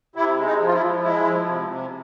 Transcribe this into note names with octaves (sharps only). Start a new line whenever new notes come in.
C3 E4
G#3
D#4
F3
F4
E4
F3
G#3 E4
F3
C3
C3